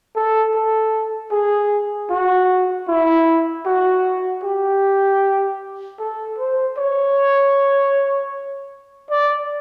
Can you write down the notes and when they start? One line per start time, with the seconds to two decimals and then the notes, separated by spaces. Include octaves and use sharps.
0.16 A4
0.55 A4
1.32 G#4
2.10 F#4
2.88 E4
3.66 F#4
4.44 G4
6.00 A4
6.39 C5
6.77 C#5
9.10 D5